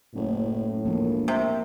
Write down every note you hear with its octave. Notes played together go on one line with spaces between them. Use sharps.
F#1 A2
E1 F3 A#3
C3